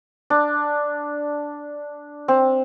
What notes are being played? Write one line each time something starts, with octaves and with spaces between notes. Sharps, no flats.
D4
C4